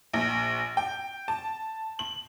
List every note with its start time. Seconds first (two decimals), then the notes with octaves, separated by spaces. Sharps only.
0.13 A#1
0.77 G5
1.28 A5
1.99 F#7